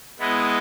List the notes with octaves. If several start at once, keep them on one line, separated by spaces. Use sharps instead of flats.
G#3 B3 E4 B4 D#5